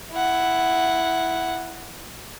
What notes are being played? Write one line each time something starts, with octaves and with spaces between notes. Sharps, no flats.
E4 F#5